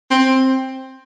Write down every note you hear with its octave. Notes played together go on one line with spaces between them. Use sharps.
C4